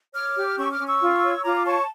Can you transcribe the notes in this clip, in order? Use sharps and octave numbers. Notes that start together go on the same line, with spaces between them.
C#5 D6 F6
G4
C#4 C#6 E6
D6 F6
C#4
C#6 E6
F4
C#5
F4 A#5 D6
D6
C#5 A5 C#6